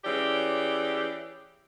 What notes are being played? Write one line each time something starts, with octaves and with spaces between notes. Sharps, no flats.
E3 C#4 G4 G#4 D5